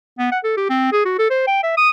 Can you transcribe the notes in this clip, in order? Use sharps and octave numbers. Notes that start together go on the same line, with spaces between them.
B3
F#5
A4
G4
C4
G#4
F#4
A4
C5
G5
E5
D#6